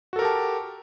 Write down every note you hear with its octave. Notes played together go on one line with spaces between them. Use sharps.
F#4 G4 A4 A#4 A5